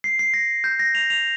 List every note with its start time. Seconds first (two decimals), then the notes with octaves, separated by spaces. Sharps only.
0.04 C7
0.19 C7
0.34 A#6
0.64 G6
0.79 A#6
0.95 F7
1.10 F7